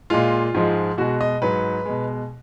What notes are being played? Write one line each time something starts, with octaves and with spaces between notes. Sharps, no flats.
A#2 G#3 F4
G#2 F3 G#3
B2 G#3 F#4
D#5
G#2 F#3 B4
B2 G#3